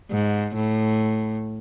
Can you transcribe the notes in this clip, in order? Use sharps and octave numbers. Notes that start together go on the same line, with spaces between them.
G#2
A2